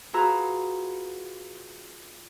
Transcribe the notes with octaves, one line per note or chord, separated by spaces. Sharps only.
F4 F#4 G#4 B4 A#5 E6